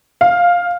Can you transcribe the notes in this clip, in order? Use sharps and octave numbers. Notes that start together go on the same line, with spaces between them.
F5